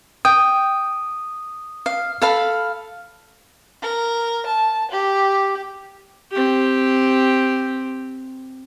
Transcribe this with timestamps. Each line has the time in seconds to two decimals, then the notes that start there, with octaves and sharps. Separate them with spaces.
0.25 G5 D#6
1.86 F5
2.22 A4 F5 B5
3.82 A#4
4.46 A5
4.91 G4
6.32 C4 G4